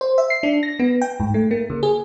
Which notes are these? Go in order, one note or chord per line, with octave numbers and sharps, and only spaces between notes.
C5
E5
C7
D4
A#6
B3
G5
G#2
A3
A#3
C#3
G#4